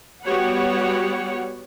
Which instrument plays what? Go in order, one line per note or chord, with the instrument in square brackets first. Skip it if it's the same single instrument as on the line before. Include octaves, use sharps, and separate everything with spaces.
[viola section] G3 B3 F#4 G4 C#5 F#5